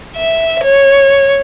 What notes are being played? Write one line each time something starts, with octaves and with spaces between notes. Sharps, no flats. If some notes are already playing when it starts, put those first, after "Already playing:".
E5
C#5